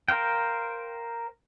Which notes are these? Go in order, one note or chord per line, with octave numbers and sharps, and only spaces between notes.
A#4 C5 F5 G5